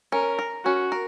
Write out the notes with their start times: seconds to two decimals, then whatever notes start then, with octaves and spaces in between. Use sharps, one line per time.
0.12 C#4 A#4
0.39 A#4
0.65 C#4 F#4
0.92 A#4